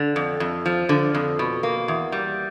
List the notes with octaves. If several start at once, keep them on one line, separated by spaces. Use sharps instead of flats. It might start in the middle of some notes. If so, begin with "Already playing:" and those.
Already playing: D3
F2
F2
F3
D3
F2
B2
A#3
E2
G3